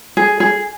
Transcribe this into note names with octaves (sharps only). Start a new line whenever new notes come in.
G#4
G#4